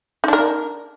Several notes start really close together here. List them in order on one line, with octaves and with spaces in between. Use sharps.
D#4 D4 A#4